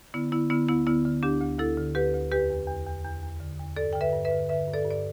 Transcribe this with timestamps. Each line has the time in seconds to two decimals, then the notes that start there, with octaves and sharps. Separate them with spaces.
0.14 D3 B3 E4
0.32 D3 B3 E4
0.50 D3 B3 E4
0.68 D2 B3 E4
0.87 D3 B3 E4
1.05 D3
1.23 D2 D4 G4
1.41 D2
1.59 D2 E4 A4
1.77 D3
1.95 D2 G4 B4
2.14 D2
2.32 E2 G4 B4
2.50 E2
2.68 E2
2.86 E2
3.04 E2
3.23 E2
3.40 D3
3.59 E2
3.76 G2 A4 D5
3.93 D3 G5
4.01 B4 E5
4.13 G2
4.25 B4 E5
4.31 D3
4.49 D3 B4 E5
4.67 G2
4.74 A4 D5
4.85 G2
4.91 D5